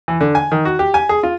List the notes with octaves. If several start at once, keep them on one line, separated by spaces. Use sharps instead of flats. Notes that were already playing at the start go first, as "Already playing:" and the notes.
E3
D3
G#5
D#3
F#4
G4
G#5
G#4
F4